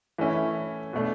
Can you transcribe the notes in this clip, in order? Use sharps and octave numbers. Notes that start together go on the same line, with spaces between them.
E3 A3 C#4 E4
B2 A3 D4